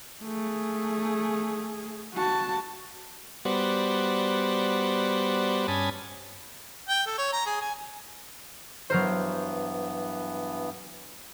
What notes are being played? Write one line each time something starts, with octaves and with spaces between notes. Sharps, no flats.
A3 G#4
F#4 A5
G3 B3 F#4 C5 D5
G2 C#4 G#5 A5 B5 D#6
G5
A4
C#5
A#5
G#4
G#5
G2 E3 F#3 B3 A#4 C5